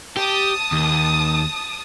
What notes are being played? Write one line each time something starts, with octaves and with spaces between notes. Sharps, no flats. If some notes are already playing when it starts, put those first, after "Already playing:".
G4 A5 D#6
D#2